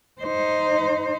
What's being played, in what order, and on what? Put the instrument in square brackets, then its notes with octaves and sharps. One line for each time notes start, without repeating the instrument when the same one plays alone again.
[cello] D#4 C5